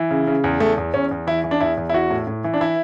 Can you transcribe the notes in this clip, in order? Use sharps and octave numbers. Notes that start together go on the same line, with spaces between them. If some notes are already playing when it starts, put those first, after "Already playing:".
Already playing: E3
C#3
C#3
E2
E2 A3
E2
E2 C#4
E2
E3 E4
E3
D4
E2 E4
E2
E4
E3 F#4
A2
A2
E3
D4
E3 E4